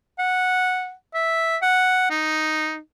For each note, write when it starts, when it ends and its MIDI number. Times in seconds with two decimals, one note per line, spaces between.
0.19 0.93 78
1.14 1.57 76
1.62 2.06 78
2.10 2.78 63